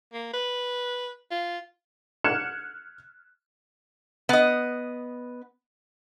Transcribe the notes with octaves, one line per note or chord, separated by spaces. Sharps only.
A#3
B4
F4
F6 F#6 G#6 C#7 E7
B3 D#5